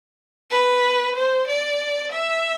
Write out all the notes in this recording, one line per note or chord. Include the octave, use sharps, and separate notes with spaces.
B4
C5
D5
E5